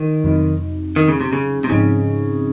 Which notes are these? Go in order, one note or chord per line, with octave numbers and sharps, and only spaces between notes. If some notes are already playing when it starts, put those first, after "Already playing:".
Already playing: D#3
F2 C3 F#3 C4 D#4
D#3
C#3
C3
C#3
C3
G#2 C#3 F3 C4 D#4